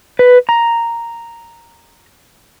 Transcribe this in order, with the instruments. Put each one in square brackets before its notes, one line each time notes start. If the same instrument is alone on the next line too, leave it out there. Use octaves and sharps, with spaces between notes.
[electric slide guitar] B4
A#5